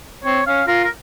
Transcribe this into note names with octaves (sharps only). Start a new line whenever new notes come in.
C4 C#5
C#4 F5
F4 A#4
A#4